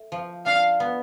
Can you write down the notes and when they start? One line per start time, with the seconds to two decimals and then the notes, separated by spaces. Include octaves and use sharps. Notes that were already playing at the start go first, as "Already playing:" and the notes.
Already playing: A3
0.12 F3
0.46 D4 F5
0.80 B3